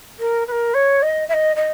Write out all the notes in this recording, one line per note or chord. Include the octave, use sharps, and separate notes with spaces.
A#4
B4
A#4
C#5
D#5
E5
D#5
D#5